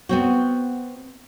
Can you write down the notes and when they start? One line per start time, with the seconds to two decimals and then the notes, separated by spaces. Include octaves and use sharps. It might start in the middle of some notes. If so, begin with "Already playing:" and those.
0.09 B3 C4 F#4